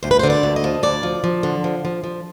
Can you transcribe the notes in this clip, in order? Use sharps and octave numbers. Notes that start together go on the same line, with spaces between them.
D2 C5
B4
D3 C5
D5
D2
D#5
F3
D2 D5
F3
F3
D3
F3
F3
F3